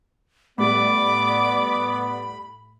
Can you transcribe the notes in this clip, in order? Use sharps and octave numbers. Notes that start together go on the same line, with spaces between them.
A2 G3 B3 D5 B5 D6